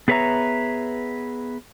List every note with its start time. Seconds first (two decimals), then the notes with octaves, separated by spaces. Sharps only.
0.08 B3 G#4 B4 C#5 E5 A#5